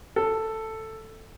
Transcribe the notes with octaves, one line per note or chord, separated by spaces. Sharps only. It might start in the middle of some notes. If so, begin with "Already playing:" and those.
A4